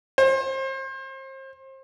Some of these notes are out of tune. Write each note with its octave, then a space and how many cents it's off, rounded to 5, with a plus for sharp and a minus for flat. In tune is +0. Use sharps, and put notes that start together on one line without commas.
C5 +35